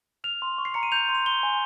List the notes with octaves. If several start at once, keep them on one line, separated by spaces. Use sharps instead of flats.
F6 F7
C6
C#6
C7
A#5 C#7
D#7
G6 F7
C6
F7
C6 G7
G#5